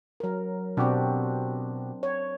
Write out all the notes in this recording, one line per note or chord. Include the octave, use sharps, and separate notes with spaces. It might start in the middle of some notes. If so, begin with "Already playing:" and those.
F#3 A#4
B2 C4 D4 F#4 G4
C#5